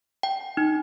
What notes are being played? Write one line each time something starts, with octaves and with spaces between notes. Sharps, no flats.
G5
D#4